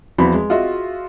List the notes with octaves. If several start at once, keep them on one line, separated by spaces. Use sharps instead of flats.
E2 F3 F#4 B5
G#3
F4 F#4 G#4 D#5 E5